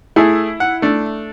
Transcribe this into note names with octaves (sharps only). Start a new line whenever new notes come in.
A3 E4 G#4
F#5
A3 D4